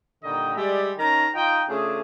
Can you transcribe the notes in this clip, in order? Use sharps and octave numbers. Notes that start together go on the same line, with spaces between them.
A#2 D3 D#3 G3 D#5 G5
G3 G#3 G4 D5 E5 G5
D#3 C#4 A#4 A5 A#5
D#4 F4 D#5 G5
C#3 A3 D4 F4 G#4